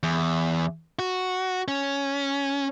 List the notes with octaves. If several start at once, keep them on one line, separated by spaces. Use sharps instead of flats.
E2
F#4
C#4